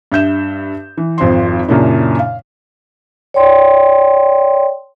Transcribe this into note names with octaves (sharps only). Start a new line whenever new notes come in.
G2 E5 G6 E7
E3
G#1 F2 C4 C5 C6
F#2 A#2 C#3 A#3 D4 E4
F5
C#5 D5 G5 C6